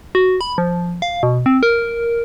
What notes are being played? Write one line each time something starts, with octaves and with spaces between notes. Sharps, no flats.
F#4
B5
F3
F5
B2
C4
A#4